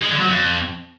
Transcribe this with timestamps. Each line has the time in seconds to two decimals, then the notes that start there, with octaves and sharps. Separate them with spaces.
0.02 G#3
0.10 D3
0.19 F#3
0.28 F2